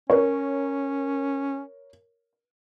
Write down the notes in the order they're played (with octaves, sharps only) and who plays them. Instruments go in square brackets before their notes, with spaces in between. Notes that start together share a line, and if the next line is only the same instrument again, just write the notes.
[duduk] C#4 [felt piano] A#4 C#5